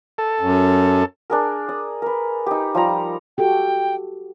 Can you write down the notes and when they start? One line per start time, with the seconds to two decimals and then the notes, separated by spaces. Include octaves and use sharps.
0.18 A4
0.41 F#2
1.30 D4 G#4 A#4
1.69 D5 D#6
2.02 A#4 B4
2.46 D#4 G4
2.75 F3 G3 A#5
3.38 F#4 G4 A4 G5